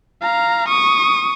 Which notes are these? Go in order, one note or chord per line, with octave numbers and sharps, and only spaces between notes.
F5 A#5
C#6 D#6